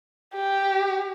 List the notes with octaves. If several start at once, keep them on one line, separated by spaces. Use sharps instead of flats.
G4